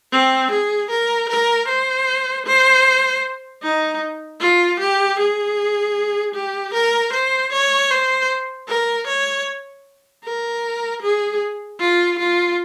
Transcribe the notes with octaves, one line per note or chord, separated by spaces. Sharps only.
C4
G#4
A#4
A#4
C5
C5
D#4
F4
G4
G#4
G4
A#4
C5
C#5
C5
A#4
C#5
A#4
G#4
F4
F4